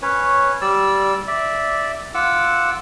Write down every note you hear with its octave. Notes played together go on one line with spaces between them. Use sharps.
C#4 B4 C#5
G3 D5 E6
D5 E5
F4 F#5 D6 E6